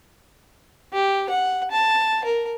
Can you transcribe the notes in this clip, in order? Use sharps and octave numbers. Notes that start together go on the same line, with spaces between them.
G4
F#5
A5
A#4